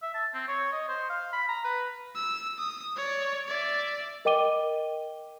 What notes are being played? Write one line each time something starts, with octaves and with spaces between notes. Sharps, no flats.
E5
A5
C4
C#5
D#5
C5
F5
B5
A#5
B4
E6
D#6
C#5 D5
D5 E5
A#4 D#5 G5 D6 D#7 G7